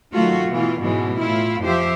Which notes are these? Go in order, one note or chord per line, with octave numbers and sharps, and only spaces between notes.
D#3 F#3 A3 F4 F#4
B2 E3 F4
G#2 B2 E3 G#3 C#4
A2 E4 F4
F2 F3 G4 C5 E5